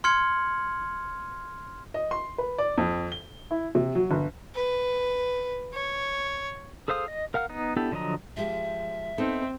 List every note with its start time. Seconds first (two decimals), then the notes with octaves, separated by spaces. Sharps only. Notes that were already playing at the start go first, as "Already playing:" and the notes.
0.04 C6 F6 G#6 C#7 F#7
1.94 D#5
2.11 C6
2.38 B4
2.58 D5
2.78 F2
3.12 G7
3.51 E4
3.75 C3
3.95 F#3
4.11 G1
4.55 B4
5.73 C#5
6.88 G#4 A4 C5 F5 D#6
7.08 D#5
7.34 A#4 F5 F#5 F6
7.49 B3 D#4
7.76 B3 D4 E4 G4 A4
7.92 D3 F3 F#3 D#5 A#5
8.37 F3 G#3 G4 E5
9.18 B3 C4 D#4 A4